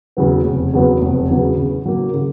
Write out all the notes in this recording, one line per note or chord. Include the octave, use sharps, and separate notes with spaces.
E2 C#3 F#3 B3
F1
E2 C#3 F#3 B3
F1
E2 C#3 F#3 B3
C#3
F#3 A#3
C#3